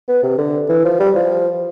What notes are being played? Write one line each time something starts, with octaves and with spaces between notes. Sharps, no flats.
B3
C3
D3
E3
F3
G3
F3